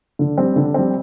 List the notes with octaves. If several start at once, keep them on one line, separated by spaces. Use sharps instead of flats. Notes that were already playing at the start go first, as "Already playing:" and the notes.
D3
G3 C4
D3
G3 C4